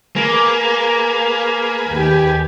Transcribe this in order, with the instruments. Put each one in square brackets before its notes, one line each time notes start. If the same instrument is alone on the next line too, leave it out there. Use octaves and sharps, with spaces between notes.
[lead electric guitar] A#3 [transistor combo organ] G#4 B4 G#5
[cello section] D#2 G4